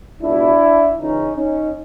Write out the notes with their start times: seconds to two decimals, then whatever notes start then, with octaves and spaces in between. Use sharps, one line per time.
0.22 C#2 B2 D4 E4
0.97 C#2 C#3 E3 C#4 D#4
1.36 C#4 D#4